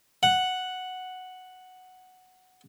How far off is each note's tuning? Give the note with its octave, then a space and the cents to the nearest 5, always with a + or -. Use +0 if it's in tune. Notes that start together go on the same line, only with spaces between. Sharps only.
F#5 +0